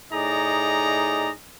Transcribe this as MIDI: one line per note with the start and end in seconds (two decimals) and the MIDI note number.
0.11 1.31 45
0.11 1.31 63
0.11 1.31 68
0.11 1.31 74
0.11 1.31 75
0.11 1.31 82